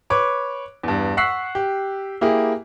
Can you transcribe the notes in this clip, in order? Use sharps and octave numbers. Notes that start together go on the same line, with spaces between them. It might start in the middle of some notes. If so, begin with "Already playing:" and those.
B4 C#5 D6
E2 G2
F#5 C#6 E6 F#6 B6 C7
G4
A#3 E4 G4 G#4